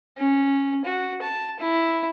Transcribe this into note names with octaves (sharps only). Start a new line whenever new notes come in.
C#4
F#4
A5
E4